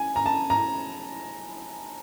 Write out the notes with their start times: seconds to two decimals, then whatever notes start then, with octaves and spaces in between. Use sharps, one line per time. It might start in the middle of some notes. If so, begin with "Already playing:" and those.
Already playing: G#5
0.16 A#5
0.26 A5
0.50 A#5